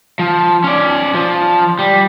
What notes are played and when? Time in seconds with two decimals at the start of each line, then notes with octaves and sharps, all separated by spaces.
0.19 F3
0.64 C#4 D5
1.14 F3
1.79 G3